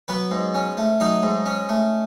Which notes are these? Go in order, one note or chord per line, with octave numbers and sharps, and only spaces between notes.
F#3 B3 B4
G#2
C#4
A3
F#3 D#4 D#5
G#2
C#4
A3